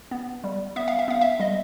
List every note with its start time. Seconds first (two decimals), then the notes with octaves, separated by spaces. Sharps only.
0.11 B3
0.44 G3
0.76 B3 E5
0.88 F5
0.99 E5
1.08 B3 F5
1.21 E5
1.40 G3 D#5